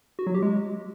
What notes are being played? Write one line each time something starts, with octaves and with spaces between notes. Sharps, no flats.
F#4
F#3
G4
G#3